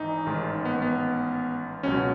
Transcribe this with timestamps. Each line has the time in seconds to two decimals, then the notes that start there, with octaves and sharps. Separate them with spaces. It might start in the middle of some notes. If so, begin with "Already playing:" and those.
Already playing: G#1 E3 D#4
0.26 A1 G#2 D#3
0.65 B3
0.82 B3
1.83 C#2 B2 F#3 C#4